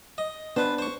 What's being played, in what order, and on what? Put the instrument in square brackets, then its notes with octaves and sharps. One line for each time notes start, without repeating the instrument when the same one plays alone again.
[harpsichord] D#5
[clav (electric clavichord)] B3 D4 [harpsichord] B4 C5
[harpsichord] C5 C#6